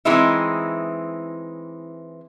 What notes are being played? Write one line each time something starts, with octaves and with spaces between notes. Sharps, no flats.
E3 G#3 C4 D#4 E4